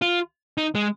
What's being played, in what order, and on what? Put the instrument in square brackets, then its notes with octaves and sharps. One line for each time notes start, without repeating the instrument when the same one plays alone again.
[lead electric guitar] F4
D#4
G#3